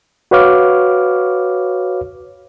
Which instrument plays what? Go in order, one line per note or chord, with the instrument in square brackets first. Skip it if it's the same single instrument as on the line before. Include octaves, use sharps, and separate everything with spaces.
[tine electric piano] F#4 B4 C#5 F5 D6 F6